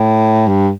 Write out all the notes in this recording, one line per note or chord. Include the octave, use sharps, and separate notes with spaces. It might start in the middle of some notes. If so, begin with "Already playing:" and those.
Already playing: A2
G2